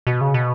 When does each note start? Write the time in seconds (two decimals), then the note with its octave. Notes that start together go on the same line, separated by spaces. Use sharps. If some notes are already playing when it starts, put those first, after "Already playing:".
0.07 B2
0.21 C#3
0.34 B2